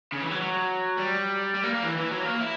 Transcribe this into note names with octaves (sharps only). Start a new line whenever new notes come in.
C#3
E3
F#3
F#3
G3
G3
A#3
A#3
E3
E3
F#3
A#3
E4